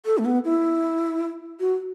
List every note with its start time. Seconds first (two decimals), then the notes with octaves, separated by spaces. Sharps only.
0.06 A4
0.18 A3
0.25 B3
0.45 E4
1.60 F#4